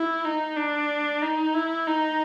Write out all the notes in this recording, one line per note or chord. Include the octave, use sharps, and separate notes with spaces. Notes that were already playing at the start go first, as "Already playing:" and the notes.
Already playing: E4
D#4
D4
D#4
E4
D#4